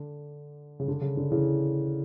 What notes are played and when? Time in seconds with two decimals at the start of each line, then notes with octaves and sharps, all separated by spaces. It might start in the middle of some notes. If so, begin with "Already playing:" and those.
Already playing: D3
0.80 C#3
0.88 D3
1.01 C#3
1.17 D3
1.30 C#3 E3